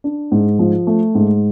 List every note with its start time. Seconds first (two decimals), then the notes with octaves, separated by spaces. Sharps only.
0.04 D4
0.32 G#2
0.59 F3
0.87 A3
1.15 G#2